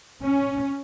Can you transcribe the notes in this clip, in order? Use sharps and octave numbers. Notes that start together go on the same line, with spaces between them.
C#4